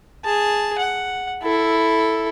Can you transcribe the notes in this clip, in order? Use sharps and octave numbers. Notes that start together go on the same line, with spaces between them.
G#4 A5
F#5
E4 A4